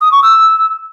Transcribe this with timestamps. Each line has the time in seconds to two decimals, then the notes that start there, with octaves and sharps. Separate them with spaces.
0.01 D#6
0.11 C#6
0.22 E6